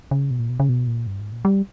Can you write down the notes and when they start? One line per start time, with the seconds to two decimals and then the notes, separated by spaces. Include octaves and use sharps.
0.11 C#3
0.31 B2
0.39 A#2
0.49 B2
0.60 C#3
0.69 B2
0.87 A#2
1.07 G2
1.20 G#2
1.32 A#2
1.45 G3